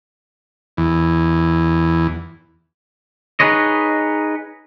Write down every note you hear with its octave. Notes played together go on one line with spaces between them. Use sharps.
E2
D#4 G#4 B4 C#5 D#5